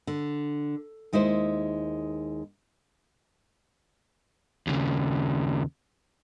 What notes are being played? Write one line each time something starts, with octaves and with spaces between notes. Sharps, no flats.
D3
D#2 G#3 D#4 E4 C5
D#2 C#3